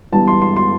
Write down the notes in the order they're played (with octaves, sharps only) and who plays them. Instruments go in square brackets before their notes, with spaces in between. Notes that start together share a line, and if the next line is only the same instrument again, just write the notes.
[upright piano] G1 G2 E3 B3 A5
C6
C6
C6